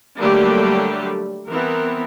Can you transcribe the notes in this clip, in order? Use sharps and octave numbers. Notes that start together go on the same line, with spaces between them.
D3 F#3 G3 A3 A#3 G4
E3 B3 C4 A#4